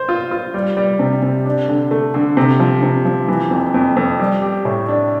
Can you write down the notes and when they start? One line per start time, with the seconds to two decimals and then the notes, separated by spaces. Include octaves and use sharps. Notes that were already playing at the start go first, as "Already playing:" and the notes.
Already playing: C5
0.09 F4
0.31 F4
0.54 G3
0.77 G3
0.99 C3
1.22 C3
1.45 D4
1.69 D3
1.91 A3
2.14 D3
2.37 C3
2.60 F3
2.83 C3
3.05 F3
3.28 E3
3.51 F2
3.74 F2
3.96 F2
4.19 G3
4.42 G4
4.65 A2
4.88 D4